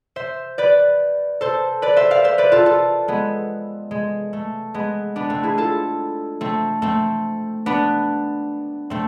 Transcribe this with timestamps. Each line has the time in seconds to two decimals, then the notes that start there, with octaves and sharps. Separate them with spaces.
0.16 C5 E5
0.58 B4 D5
1.41 A4 C5
1.82 B4 D5
1.97 C5 E5
2.11 D5 F5
2.24 C5 E5
2.38 B4 D5
2.52 F4 A4
2.66 F4 A4
3.08 G#3 B3
3.91 G#3
4.33 A3
4.74 G#3 B3
5.16 B3 D4
5.30 A3 C4
5.43 E4 G#4
5.58 F4 A4
6.41 A3 C4
6.82 A3 C4
7.66 B3 D4
8.90 A3 C4